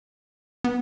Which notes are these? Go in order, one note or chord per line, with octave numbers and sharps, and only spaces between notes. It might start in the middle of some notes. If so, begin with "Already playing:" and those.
B3